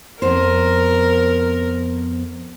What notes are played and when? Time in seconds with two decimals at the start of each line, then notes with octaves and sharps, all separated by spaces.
0.22 F2 B3 A#4 C5